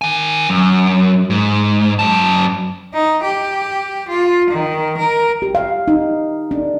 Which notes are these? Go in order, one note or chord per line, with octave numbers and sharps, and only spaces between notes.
D#3 G#5
F#2
G#2
F#2 A5
D#4
G4
F4
D#3
A#4
G4
F5
D#4
D4